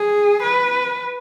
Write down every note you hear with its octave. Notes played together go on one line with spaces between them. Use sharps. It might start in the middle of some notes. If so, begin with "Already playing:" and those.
Already playing: G#4
B4